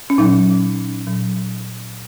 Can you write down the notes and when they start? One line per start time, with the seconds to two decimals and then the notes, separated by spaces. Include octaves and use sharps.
0.10 C#4
0.18 A#2 F#3 D#4
1.07 A#2 F#3